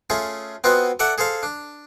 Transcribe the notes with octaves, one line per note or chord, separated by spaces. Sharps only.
A3 C#4 F4 G#4
B3 C4 F4 F#4 D#5 G#5
A4 D5 E5 F#5
G#4 A4 C5 F5
D4